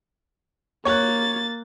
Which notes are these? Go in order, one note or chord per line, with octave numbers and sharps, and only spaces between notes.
A#3 C#5 F#6 A6